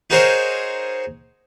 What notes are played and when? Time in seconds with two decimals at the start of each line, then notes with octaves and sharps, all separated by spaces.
0.10 D#4 F#4 G#4 A#4 C5 C#5